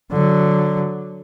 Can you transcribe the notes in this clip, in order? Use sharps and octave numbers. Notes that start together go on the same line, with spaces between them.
D3 F#3